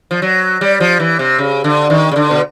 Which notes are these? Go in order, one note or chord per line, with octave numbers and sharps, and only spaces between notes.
F3
F#3
G3
F3
E3
C3
C#3
D3
D#3
C#3
D3
B2